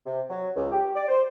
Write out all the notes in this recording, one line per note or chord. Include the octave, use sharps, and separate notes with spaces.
C3
F#3
C#2
G4
D5
C5